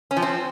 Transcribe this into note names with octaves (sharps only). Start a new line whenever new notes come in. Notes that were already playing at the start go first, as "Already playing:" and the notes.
C#4
F3
C4